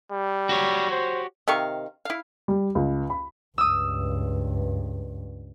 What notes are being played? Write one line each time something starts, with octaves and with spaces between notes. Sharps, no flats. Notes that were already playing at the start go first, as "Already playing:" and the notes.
G3
F#4 G4 C#5
C5
C3 D#3 F5 C#6
E4 F5
G3
C#2
B5
C#2 G2 D#6 E6